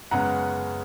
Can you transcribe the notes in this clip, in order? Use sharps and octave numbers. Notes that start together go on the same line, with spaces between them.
F#2 C#3 G#3 B3 F#5 A#5